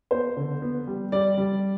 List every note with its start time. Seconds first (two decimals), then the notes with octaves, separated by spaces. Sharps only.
0.11 B3 C5
0.37 D3
0.62 B3
0.87 G3
1.12 G3 D5
1.37 G3